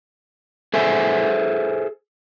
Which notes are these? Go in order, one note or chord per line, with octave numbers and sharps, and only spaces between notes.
G#4 A4 C5 E5 G#5